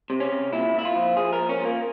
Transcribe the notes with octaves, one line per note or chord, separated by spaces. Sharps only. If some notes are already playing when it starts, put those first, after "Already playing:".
C3
C#4
C3
A#2 E4
A#2 E4
F4
F3
F3 G#4
A#4
A#2
C#4
A#2
A#3